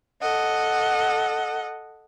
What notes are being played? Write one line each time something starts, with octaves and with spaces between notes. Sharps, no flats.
A4 D#5 F#5